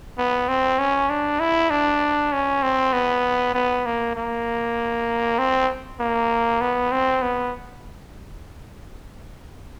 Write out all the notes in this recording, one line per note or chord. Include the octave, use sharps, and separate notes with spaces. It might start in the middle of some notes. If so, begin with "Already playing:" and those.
B3
C4
C#4
D4
E4
D4
C#4
C4
B3
B3
A#3
A#3
C4
A#3
B3
C4
B3